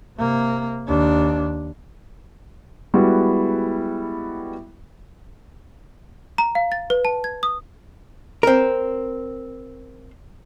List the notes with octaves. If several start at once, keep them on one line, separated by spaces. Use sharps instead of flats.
C3 A#3
D#2 D4
G3 G#3 B3 E4 F#4
A#5
F5
A6
B4
A5
G#6
D#6
C4 A#4